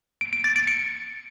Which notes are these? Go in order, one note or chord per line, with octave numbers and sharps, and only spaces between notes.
D7
D7
A6
D7
C#7